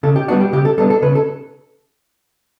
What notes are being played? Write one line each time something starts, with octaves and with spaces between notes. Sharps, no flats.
C#3 A4
G4
G3 B3 D4 F#4
G4
C#3 G4
A4
G3 B3 D4 A4
A4
C#3 B4
A4